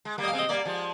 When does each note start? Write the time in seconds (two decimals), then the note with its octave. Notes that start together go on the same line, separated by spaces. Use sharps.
0.05 G#3
0.18 G3 A#3
0.24 D#5
0.28 F5
0.33 G#3 C4
0.39 D#5
0.49 G3 A#3 D5
0.65 F3 G#3